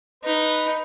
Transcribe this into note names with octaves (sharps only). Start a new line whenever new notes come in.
D#4 B4